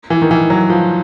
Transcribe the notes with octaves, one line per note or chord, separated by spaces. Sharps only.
E3
D#3
E3
F#3
F3